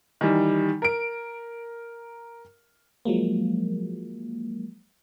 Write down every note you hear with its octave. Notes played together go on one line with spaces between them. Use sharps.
D#3 E3 G3
A#4 D7
F3 F#3 G#3 A#3